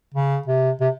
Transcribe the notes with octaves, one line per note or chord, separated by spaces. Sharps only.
C#3
C3
C3